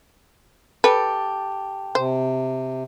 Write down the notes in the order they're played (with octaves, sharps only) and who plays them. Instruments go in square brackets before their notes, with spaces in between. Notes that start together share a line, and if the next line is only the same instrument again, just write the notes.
[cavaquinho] G4 A4 [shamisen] B4
[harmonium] C3 [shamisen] C5